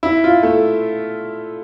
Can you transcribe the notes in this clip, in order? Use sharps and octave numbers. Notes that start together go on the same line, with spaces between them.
E4
F4
A3